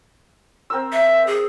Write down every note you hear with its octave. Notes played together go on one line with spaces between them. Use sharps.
C4 A#4 E6
E5
G#4